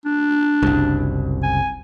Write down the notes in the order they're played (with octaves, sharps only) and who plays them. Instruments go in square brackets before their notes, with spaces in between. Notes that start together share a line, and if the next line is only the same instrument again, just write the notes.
[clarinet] D4
[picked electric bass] F#1 C2
[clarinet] G#5